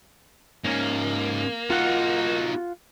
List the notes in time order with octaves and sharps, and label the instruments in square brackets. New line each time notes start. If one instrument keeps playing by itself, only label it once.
[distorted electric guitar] G#2 C#4 [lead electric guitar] A#3
[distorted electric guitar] D#4 F#4 [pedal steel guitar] F4 F#5